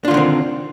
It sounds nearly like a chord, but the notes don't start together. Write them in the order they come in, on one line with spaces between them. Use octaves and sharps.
D4 F4 D3 D#3 C4